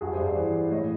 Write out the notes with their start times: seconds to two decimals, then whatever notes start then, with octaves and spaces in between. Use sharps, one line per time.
0.01 G2 F#4 G#4
0.13 C5 D5
0.19 G2
0.25 C5 D5
0.36 E3
0.54 E3
0.71 A2 C#5 D#5